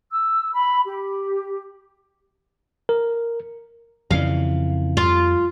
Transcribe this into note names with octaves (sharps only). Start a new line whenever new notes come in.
E6
B5
G4
A#4
F2 C#3 E3 F5
F2 F4